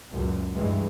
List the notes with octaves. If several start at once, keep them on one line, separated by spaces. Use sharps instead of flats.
C#2 F#2 A#2
G2 E3 G#3